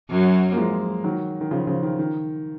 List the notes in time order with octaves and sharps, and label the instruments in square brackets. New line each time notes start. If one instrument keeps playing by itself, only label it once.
[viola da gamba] F#2 F#3
[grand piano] A#3
F3 G#3
D#3 F#3
D#3
C#3 F3
C#3 F3
D#3
D#3